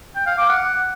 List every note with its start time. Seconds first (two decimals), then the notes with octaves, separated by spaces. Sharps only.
0.15 G5
0.27 F5
0.38 D6
0.49 F#5